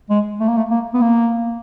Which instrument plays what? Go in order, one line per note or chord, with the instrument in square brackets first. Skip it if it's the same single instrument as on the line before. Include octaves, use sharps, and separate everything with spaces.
[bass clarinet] G#3
A3
A#3
A3
A#3
B3
A#3